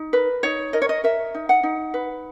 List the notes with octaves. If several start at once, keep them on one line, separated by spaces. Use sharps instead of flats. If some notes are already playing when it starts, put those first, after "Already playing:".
Already playing: D#4
A#4 B4
D#4 C#5
A#4 D#5
C#5
D#5
A#4 E5
D#4
F#5
D#4
B4